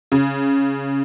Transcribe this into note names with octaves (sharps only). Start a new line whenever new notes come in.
C#3